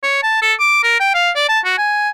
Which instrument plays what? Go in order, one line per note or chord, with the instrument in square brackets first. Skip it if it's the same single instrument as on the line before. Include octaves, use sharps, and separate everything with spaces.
[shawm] C#5
A5
A4
D6
A#4
G5
F5
D5
A5
F#4
G#5